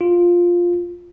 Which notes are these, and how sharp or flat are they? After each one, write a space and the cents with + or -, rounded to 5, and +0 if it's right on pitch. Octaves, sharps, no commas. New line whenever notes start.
F4 +5